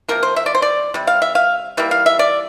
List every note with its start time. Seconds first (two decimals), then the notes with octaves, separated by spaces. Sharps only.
0.08 C3 F3 A#3 A#4
0.23 C5
0.36 E5
0.46 D5
0.55 C5
0.62 D5
0.94 C3 G3
1.07 F5
1.22 E5
1.35 F5
1.77 E3 G3 A#3 E5
1.91 F5
2.06 E5
2.19 D5